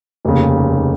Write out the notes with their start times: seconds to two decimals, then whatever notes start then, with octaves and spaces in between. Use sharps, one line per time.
0.25 F1 D#2 C#3